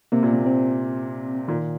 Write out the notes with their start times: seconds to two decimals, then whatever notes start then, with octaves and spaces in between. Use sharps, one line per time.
0.12 C3 A#3
0.23 A#2
0.33 C3
0.46 C4
1.48 A#2 D#3